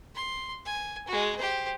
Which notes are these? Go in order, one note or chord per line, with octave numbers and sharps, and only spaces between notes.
C6
G#5
G#3 F#4
G4 C5